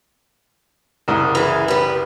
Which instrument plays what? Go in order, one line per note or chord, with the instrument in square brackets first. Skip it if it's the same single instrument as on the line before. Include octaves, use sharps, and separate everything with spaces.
[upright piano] F#1 C2 D#6
[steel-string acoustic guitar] E3 G#4
G3 B4